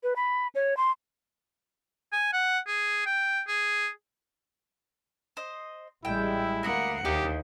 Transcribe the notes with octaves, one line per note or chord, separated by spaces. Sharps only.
B4
B5
C#5
C6
G#5
F#5
G#4
G5
G#4
C5 D#5
A1 G3 G#3 E4 A4 G5
D2 A#3 E5 F#5 B5 D#6
D#2 D#4 E4 G4 D#5